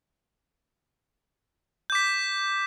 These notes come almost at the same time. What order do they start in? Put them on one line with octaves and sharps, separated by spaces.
G6 D6 B6